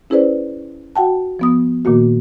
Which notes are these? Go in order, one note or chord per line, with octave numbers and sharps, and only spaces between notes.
C#4 E4 G#4 B4 C5 D5
F#4 F#5 G5 A5
F3 B3 D#6
A#2 D#3 A#3 F#4